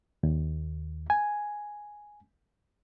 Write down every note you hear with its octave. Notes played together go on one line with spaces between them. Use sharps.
D#2
G#5